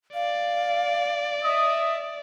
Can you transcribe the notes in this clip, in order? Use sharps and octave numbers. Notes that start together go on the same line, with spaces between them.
D5 F5
D#5 E5 D#6